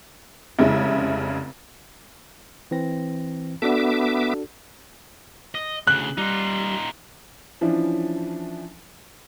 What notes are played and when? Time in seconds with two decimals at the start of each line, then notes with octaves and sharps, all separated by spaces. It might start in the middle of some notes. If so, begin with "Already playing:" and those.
0.59 F1 C#3 G#3 E4 E5
2.71 E3 C4 A#6
3.62 B3 D4 F#4 A4 E5 D6
5.55 D#5
5.87 D2 C#3 F#6
6.18 G3 D#4 F4
7.61 E3 F3 C#4 D4 E4